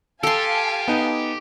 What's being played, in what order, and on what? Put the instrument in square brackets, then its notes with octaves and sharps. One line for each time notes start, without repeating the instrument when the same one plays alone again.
[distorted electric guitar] G4 [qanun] A4 C6 [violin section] F5 G#5 A5 [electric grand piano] E6
[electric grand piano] B3 D#4